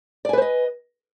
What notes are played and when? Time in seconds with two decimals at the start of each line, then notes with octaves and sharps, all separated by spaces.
0.25 D5
0.29 G#5
0.33 B4
0.38 C5
0.42 D#5